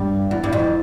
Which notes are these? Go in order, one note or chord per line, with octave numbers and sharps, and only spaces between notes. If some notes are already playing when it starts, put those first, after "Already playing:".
Already playing: G2
E2
G2
F2